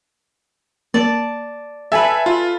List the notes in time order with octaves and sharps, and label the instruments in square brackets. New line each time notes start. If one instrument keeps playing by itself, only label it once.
[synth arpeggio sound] A#3 [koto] D5 A5
[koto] A4 B4 [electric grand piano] E5 G#5
[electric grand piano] F4